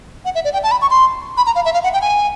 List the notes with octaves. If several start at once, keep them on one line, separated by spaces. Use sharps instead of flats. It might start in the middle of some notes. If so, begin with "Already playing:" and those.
F#5
E5
D5
G5
A5
B5
C#6
C6
B5
A#5
F5
E5
F5
F#5
G5
G#5